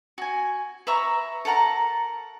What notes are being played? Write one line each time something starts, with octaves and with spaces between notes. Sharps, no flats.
F#4 G#5
B4 E5 A#5 C#6
A4 A#4 F#5 A#5